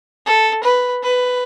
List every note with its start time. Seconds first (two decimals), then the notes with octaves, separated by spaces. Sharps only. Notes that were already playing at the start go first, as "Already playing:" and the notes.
0.26 A4
0.63 B4
1.03 B4